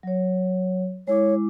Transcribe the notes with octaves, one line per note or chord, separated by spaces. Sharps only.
F#3 C#5
G#3 E4 C#5 D6